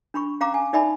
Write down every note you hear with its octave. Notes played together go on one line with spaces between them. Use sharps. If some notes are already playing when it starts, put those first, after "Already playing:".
D4 B5 C#6
C#4 F5 A#5 D6
G#5
D#4 D5 E5 G#5 B5